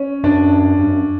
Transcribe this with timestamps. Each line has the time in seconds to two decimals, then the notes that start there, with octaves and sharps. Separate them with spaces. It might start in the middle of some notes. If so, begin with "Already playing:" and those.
Already playing: C#4
0.24 F#2 D4
0.79 G2
0.89 F#2